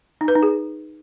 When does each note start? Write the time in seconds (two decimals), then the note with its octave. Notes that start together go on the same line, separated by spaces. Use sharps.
0.21 D#4
0.28 B4
0.35 D#4
0.43 G#4